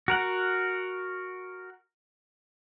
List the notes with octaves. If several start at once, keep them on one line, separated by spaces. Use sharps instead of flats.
F#4 A#4 F#5